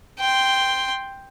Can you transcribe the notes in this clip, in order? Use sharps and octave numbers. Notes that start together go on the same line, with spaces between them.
G5 C6